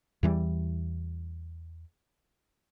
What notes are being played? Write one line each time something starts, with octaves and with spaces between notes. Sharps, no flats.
E2 E3 F3 G3